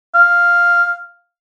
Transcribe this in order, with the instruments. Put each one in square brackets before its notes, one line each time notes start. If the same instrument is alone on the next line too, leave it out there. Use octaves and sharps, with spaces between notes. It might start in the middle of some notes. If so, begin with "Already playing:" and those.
[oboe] F5